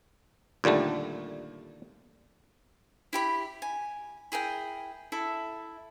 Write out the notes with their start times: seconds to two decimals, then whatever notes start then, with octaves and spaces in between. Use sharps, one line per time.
0.64 D#2 A#2 D3 G3 A3
3.13 E4 G4 B5
3.62 G#5
4.32 E4 G#4 A#4 G5
5.12 E4 A4 E5